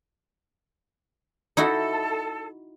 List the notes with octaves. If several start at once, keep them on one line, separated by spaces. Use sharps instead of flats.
D#4 E4 F#4 A4